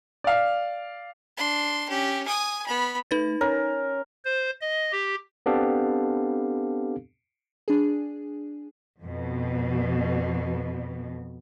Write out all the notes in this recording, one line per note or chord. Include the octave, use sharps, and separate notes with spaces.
D5 F5
D4 C6
C#4 G4
G#5 D#6
B3 B5
A3 D#4 B4 A6
C#4 A#4
C5
D#5
G4
B3 C4 D4 G4 A4 F5
D4 G#4
F2 B2